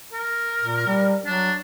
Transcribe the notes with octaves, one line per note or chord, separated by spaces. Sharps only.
A#4
A#2
G3
F#3 D4